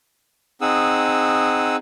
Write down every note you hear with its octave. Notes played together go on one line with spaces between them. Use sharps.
C4 D#4 G#4 F#5 D#6 E6